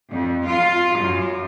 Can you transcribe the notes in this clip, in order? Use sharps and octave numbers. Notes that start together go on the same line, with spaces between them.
F2
F4
F#2